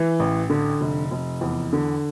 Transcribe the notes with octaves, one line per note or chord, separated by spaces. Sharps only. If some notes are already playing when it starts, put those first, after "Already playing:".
Already playing: E3
A1
D3
F1
F1
E2
D3